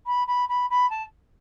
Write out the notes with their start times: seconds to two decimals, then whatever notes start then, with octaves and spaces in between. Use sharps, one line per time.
0.06 B5
0.27 B5
0.48 B5
0.70 B5
0.90 A5